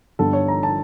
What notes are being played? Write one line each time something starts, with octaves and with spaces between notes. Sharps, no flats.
G1 G2 D3 A4
C#5
A#5
A5